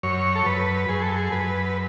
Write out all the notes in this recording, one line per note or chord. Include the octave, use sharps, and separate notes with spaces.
F#2 C#5
A4
F#2 B4
F#2 G#4
A4
G#4
F#2 B4